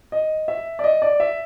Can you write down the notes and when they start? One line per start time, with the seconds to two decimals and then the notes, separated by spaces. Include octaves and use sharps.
0.12 D#5
0.48 E5
0.79 D5
0.84 D#5
1.02 D5
1.20 E5